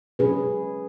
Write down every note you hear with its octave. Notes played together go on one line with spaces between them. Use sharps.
F#3 C#4 G#4 B4